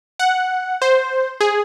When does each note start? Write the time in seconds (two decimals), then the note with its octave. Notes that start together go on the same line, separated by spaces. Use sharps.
0.19 F#5
0.82 C5
1.41 G#4